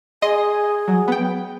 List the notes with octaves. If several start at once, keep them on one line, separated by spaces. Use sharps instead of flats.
G#4 D#5 C6
F#3
B3 G5